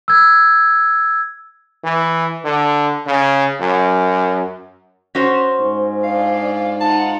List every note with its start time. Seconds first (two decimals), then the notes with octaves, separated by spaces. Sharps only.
0.08 E6 G#6
1.84 E3
2.45 D3
3.07 C#3
3.61 F#2
5.15 C#4 F#4 C5
5.59 G#2
6.04 D4 F4 D5 F5
6.81 D#4 F4 F#5 A5